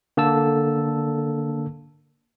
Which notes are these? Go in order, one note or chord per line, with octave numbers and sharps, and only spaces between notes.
D3 A#3 A4 A5 E6